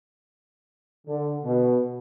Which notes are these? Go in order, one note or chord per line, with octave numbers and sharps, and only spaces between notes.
D3
B2